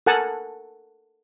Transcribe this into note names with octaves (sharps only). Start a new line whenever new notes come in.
A4 A#4 F#5 G#5 A5